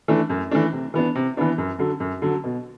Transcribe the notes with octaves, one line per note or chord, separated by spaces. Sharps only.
E3 A3 D4
F#2
E3 A3 D4
C3
E3 B3 D4
C3
E3 B3 D4
F#2
D3 F#3
F#2
D3 F#3
B2